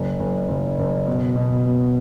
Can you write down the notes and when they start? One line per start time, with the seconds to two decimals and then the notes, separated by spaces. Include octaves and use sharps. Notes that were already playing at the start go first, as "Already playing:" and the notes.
Already playing: F#1
0.19 F#1
0.48 F#1
0.79 F#1
1.07 B2
1.36 B2
1.66 B2